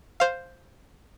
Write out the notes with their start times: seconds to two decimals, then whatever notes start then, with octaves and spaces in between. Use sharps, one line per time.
0.20 C5 F5